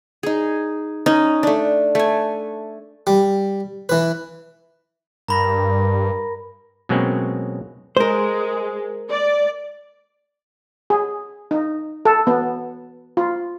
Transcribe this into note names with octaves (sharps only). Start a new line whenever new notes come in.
D#4 G#4
C#4 D#4
A3 D4
A3 G#5
G3
E3 B4
G2 A#4 A#5 B5 A#6
B2 F#3 G#3 A#3 C4 C#4
G#3 A#4 C5
D5
G#4
D#4
A4
B3
F4